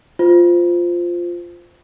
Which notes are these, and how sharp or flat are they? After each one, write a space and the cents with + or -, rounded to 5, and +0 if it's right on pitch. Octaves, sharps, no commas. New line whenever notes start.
F4 +0 C5 -15